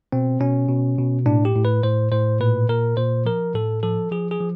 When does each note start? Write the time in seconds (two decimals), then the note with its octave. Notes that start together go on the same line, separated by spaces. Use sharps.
0.12 B2 C4
0.40 B2 C#4
0.69 B2
0.98 B2
1.26 A2 D4
1.45 G4
1.55 A2
1.65 B4
1.83 A2 C5
2.12 A2 C5
2.40 A#2 B4
2.69 A#2 A#4
2.97 A#2 C5
3.26 F3 A#4
3.54 A2 A4
3.83 F3 A4
4.11 F3 G#4
4.31 G#4
4.41 F3